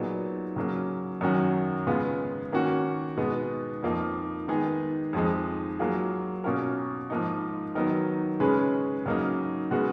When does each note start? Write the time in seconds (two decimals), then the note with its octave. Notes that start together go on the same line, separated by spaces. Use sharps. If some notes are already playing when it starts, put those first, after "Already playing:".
Already playing: A#2 F#3 B3 D#4 G#4
0.56 C#3 F#3 A#3
1.21 F#2 D#3 F#3 C#4 F#4
1.87 C#3 G#3 B3 F4
2.52 D#3 A#3 C#4 F#4
3.17 B2 G#3 B3 D#4
3.83 F2 F3 A#3 D#4
4.48 D#3 G#3 B3 D#4 G#4
5.13 F2 F3 G#3 D#4
5.79 F#3 A#3 F4 G#4
6.44 B2 A#3 C#4 F4 A#4
7.10 G#2 F3 A#3 D#4
7.75 D#3 F#3 B3 D#4 A#4
8.40 C#3 G#3 C#4 G#4 B4
9.06 C#3 F#3 A#3 D#4
9.71 C#3 G#3 B3 F#4